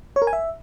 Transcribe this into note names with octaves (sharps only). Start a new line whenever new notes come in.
C#5
A#4
G#5
E5